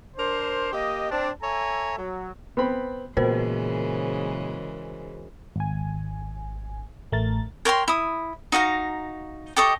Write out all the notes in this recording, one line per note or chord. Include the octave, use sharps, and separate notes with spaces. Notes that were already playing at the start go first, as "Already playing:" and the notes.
D4 A#4 C5
A#3 G4 D#5
C4 D4
A4 C#5 E5 G#5 A#5
F#3
B3 C4 B5
A#2 C#3 E3 G#3 B3 F#4 A#4 C5
G#1 G#5
A1 A3 A#4 A6
A#4 C#5 G5 C6
E4 D#6
D#4 F#4 F5 A#5
G4 A4 D#5 C#6